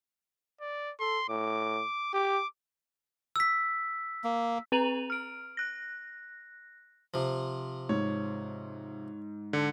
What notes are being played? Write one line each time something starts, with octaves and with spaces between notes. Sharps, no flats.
D5
A4 C6
A2 D6
G4 D6
E6 B6
A#3
C4 B4 A#5 D#7 F7 F#7
F6 D7
F#6 A#6
C3 F3
G#2 C#5
D3